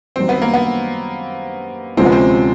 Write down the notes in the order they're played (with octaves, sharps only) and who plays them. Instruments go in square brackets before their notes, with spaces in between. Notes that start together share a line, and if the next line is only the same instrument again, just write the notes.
[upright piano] F#2 D#3 G3 [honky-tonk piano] C4
[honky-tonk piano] B3
A#3
B3
[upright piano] D2 C3 F3 G#3 C#4 [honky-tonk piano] C4
[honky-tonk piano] B3
C4